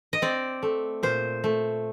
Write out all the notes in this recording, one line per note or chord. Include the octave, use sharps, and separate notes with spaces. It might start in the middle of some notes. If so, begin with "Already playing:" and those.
D#5
C4 D5
A3
A#2 C5
A3